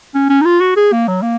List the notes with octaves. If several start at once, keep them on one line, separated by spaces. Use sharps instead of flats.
C#4
C#4
D#4
F4
F#4
G#4
A#3
F#3
A#3